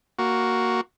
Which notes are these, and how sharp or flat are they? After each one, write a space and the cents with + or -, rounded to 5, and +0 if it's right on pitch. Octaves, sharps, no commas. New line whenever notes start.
A#3 +0 F#4 +0